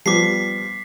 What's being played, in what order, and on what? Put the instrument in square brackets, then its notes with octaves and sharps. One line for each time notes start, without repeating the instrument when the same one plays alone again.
[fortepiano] F3 G3 B3 [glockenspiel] D6 B6 C7